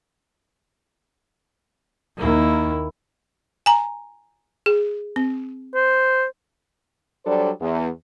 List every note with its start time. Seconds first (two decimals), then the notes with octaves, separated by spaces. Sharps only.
2.17 D#2 D#3 A#3 E4
3.66 G#5 A#5
4.66 G#4
5.16 C4
5.75 C5
7.26 F#3 G3 D4 A4 C5 D5
7.61 E2